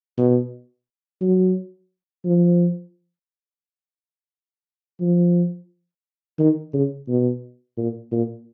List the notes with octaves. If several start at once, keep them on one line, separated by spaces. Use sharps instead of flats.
B2
F#3
F3
F3
D#3
C#3
B2
A#2
A#2